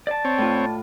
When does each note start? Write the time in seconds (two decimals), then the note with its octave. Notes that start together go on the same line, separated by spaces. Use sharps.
0.07 D5 A5
0.25 C4 C#5
0.38 A2 F4